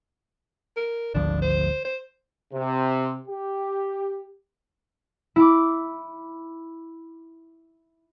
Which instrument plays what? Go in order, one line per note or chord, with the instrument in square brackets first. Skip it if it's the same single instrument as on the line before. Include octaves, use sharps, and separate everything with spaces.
[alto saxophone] A#4
[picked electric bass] G#1 D2 F3 [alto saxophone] D4
[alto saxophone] C5
C5
[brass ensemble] C3
G4
[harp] E4 D6